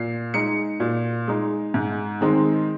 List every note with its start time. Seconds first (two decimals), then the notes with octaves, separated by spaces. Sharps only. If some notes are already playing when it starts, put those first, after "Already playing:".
Already playing: A#2 C7
0.34 G#3 D#4 C#7
0.80 A#2
1.28 G#3 D#4
1.74 G#2
2.21 D#3 G#3 C4 D#4